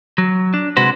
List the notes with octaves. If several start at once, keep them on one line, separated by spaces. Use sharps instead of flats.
F#3
D4
C3 G#3 F#4 B4 C5